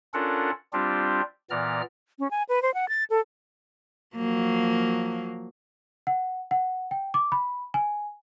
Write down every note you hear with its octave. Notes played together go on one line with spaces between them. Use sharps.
C#4 D4 F4 A4 A#4 F#5
G3 C4 D4 F4 G4
A#2 E3 B3 D5 A#5 F6
C#4
G#5
B4
C5
F#5
A6
A4
F3 F#3 A#3
F#5
F#5
G5
D6
B5
G#5